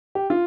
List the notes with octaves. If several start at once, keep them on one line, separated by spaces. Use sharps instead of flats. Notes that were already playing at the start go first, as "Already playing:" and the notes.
G4
F4